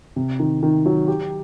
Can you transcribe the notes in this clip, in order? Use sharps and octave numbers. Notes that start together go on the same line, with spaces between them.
C3
D#3
D#3
F#3
G4